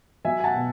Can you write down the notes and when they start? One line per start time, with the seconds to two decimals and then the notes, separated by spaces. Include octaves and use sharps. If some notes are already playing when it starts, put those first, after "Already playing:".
0.25 F#3 E5 G#5
0.40 G#5
0.44 F#5 A5
0.54 B2